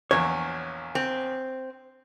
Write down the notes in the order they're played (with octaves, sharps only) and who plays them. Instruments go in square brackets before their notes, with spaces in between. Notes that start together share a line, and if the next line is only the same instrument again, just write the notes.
[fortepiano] A#1 E2 [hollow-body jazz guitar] C#5
[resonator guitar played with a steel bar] C4